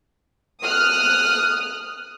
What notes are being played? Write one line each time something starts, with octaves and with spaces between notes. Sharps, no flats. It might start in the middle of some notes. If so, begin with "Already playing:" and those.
D#6 F6 F#6